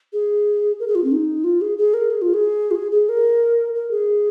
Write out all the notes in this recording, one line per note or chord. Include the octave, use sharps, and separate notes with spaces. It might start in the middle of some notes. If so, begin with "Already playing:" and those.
G#4
A#4
G#4
F4
C4
D#4
F4
G#4
G#4
A#4
G#4
F4
G#4
F4
G#4
G#4
A#4
A#4
G#4